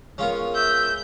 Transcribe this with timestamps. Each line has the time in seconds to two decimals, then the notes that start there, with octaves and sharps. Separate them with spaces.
0.18 G#3 B3 C#4 F4 A#4
0.55 E5 G6